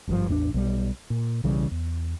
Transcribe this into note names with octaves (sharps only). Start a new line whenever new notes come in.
G#1 G2 A#2 F3
A1 E2 C4 D4
B1 G3
A#2
B1 C#3 E3 G3
E2